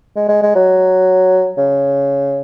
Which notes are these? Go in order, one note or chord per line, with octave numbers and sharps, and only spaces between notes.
G#3
G#3
G#3
F#3
C#3